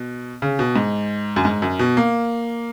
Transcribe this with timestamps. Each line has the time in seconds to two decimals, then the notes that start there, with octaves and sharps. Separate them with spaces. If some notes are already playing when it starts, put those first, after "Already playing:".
Already playing: B2
0.42 C#3
0.59 B2
0.76 G#2
1.36 F#2
1.45 G#2
1.62 F#2
1.79 B2
1.97 A#3